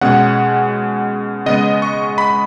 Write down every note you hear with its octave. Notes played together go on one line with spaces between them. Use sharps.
B2 G#3 C#4 F#5
C#3 G#3 B3 D#5
C#6
B5